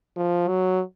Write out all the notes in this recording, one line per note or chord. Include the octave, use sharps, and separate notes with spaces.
F3
F#3